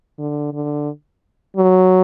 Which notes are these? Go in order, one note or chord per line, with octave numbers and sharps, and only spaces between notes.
D3
D3
F#3